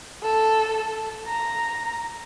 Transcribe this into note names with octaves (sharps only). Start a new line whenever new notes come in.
A4
A#5